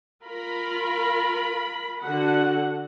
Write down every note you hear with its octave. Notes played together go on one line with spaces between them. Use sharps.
F4 A#4 B5
D3 F#4 F#5